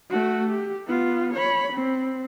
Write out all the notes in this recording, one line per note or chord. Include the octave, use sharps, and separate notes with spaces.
A3 F#4
G4
B3 F4
C#5 B5
C4